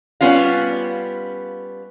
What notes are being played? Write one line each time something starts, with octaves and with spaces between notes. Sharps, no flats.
G3 B3 C#4 F4 F5